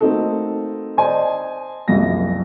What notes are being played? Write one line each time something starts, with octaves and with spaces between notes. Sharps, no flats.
A3 A#3 C4 D#4 F#4 A4
C5 D5 D#5 G#5 A5
F#1 C2 F#2 F3 F5 A#6